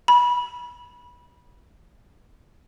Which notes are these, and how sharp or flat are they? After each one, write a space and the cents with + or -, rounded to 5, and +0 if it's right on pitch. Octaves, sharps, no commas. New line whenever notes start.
B5 -20